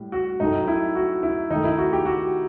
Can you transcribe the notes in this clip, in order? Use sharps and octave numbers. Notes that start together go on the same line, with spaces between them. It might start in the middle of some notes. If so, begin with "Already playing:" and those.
Already playing: A2 G3
F#4
A2 F#3 A3 D#4
E4
F#4
E4
D#3 A3 D#4
E4
F#4
G4
F#4